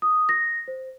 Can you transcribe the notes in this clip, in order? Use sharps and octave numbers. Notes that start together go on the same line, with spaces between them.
D#6
A#6
C5